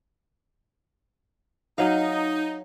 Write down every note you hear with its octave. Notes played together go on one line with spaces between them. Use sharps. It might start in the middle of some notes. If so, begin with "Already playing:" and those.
F#3 D#4 F5